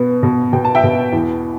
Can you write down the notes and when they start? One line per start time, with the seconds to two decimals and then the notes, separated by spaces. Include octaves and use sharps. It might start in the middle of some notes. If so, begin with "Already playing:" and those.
Already playing: B2 B3
0.23 B2
0.53 B2 G5
0.65 A5
0.75 E5 G5
0.84 B2
1.13 E2